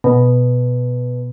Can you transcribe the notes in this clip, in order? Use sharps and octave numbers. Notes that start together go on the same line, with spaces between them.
B2